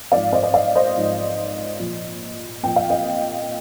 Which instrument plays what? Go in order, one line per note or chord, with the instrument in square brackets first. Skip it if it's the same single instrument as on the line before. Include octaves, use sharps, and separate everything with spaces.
[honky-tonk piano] G#2 F3 D5 F5
C5 D#5
D#5
D5 F5
C5 D#5
G#2 F3
A#2 F3
A#2 F3 G5
F5
D#5 G5